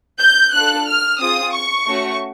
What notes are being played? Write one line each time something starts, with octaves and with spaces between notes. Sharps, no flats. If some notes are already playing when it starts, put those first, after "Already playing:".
G6
D4 F4 A4 F#6
F6
C4 F4 G#4 D#6
C#6
A3 C#4 F#4